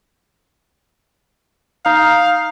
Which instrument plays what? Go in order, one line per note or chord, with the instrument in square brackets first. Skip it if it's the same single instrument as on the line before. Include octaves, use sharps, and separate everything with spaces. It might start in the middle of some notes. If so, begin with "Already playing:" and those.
[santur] D#4 [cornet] F5